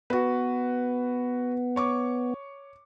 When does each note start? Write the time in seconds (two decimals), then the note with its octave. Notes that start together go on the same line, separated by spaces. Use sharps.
0.10 B3 F#4 B4
1.76 C#5 C#6 D6